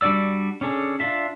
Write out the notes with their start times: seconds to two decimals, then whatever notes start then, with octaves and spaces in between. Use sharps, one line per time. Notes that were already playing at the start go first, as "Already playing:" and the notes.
0.01 G3 D4 F#4 D5 E6
0.61 C#4 D4 G#4 A4
1.00 D4 F4 E5